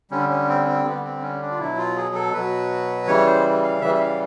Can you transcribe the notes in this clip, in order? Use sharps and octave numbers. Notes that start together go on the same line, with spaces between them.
D3 G3 C#4
C#4
C4
C#4
C4
D3 G3 B3
C4
C#4
D4
F4
B2 F#3 E4
F4
G#4
A4
B2 F#3 B4
C#3 E3 G3 C#5
C5
F5
C#3 E3 G3 E5
E5
F5